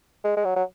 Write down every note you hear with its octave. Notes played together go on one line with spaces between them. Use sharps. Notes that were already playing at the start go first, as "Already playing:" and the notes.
G#3
G#3
F#3
F#3